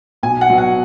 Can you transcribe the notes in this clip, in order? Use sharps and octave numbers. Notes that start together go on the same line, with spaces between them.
B1 G#5
F#5
B2 F#3
F#5